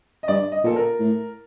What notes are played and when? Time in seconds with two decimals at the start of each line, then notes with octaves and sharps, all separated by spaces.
0.23 D#5
0.28 G2 D5
0.52 D#5
0.64 A#2 A4
0.76 A#4
1.00 A2